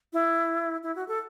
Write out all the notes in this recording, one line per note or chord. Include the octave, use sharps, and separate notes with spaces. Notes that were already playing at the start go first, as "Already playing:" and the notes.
E4
E4
F#4
A4